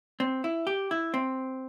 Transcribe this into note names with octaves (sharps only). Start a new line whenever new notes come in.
C4
E4
G4
E4
C4